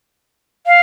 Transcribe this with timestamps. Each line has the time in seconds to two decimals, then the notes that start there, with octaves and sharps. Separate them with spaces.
0.67 F5